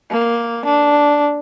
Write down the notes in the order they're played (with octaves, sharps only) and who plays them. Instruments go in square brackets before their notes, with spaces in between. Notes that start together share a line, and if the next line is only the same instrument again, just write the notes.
[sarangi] A#3
D4